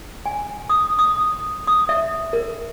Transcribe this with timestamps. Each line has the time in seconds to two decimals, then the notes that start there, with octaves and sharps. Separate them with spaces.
0.26 G#5
0.69 D#6
0.99 D#6
1.67 D#6
1.89 E5
2.33 A#4